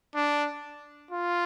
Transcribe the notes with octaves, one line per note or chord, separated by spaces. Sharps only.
D4
F4